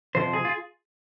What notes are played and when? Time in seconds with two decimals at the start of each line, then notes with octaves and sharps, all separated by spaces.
0.15 F2 C3 F3 C5
0.33 G#4
0.45 F4